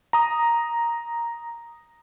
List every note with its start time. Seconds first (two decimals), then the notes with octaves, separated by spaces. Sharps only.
0.13 A#5 D#6